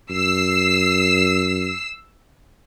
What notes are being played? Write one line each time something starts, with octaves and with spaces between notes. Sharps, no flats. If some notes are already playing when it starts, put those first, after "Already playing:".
F#2 E6 C7